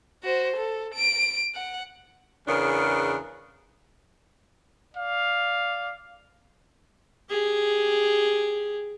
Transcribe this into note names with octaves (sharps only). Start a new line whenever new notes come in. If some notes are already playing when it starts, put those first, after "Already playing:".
F#4 C5
A4
D7
F#5
E2 C#3 B3 D4 A#4
D5 F5
G4 G#4